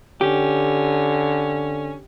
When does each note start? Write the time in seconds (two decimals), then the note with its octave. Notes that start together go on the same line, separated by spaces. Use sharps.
0.21 D3 C#4 G4